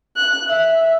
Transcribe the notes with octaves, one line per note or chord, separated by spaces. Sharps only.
F#6
E5